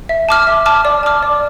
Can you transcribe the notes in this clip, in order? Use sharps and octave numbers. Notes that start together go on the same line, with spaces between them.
E5
A5 D6 F6
E5
A5 D6 F6
D5
A5 D6 F6
D5